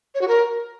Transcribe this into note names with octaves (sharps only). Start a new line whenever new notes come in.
C#5
F#4
A#4